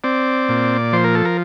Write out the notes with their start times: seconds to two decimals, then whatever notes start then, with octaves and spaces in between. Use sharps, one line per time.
0.04 C4 D5
0.49 A#2
0.93 F3 C5
1.04 A#4
1.15 A4
1.25 A#4